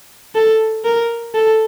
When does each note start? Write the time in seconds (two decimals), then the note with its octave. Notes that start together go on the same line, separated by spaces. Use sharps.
0.35 A4
0.84 A#4
1.34 A4